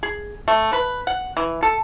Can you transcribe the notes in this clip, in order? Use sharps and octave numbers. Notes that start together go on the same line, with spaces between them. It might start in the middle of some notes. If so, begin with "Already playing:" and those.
G#4
A3
B4
F#5
E3
A4